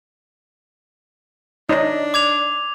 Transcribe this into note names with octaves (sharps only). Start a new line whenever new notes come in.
D4 D#4 C#5 D#5
D6 G#6 F7